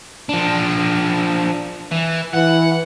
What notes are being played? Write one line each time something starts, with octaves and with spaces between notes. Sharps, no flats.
F3 D4
E3
E3 F#5